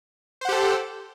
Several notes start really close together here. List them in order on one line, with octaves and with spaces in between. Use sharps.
C5 F#5 G4 A4